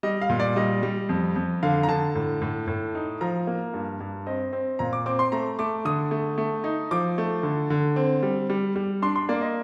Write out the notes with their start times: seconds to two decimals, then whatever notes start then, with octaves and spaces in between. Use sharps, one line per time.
0.03 G3 D#5
0.21 F5
0.30 A#2
0.40 D5
0.56 G3 D#5
0.83 G3
1.09 F2
1.36 F2
1.63 D3 F5
1.83 A#5
1.88 D3 A5
2.15 A2
2.42 A2
2.67 A2
2.95 D#4
3.21 F3 A#5
3.47 A#3
3.74 G2
4.00 G2
4.27 C4 D#5
4.53 C4
4.79 A#2 A#5
4.93 D6
5.06 C4 D6
5.19 C6
5.32 A3 A#5
5.59 A3 D6
5.85 D3 D#6
6.11 A3
6.38 A3
6.64 D#4
6.91 F3 D6
7.18 A3
7.43 D3
7.70 D3
7.96 C4
8.23 G3
8.50 G3
8.76 G3
9.02 D4 C6
9.16 C6
9.29 A#3 D5
9.42 D#5